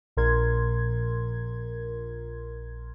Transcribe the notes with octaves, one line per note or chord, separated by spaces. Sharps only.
A#1 A#2 A#4 C6 G#6